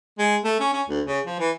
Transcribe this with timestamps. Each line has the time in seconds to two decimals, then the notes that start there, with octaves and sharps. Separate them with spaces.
0.19 G#3
0.44 A3
0.60 C#4
0.73 C#4
0.89 D2
1.07 C#3
1.26 F3
1.39 E3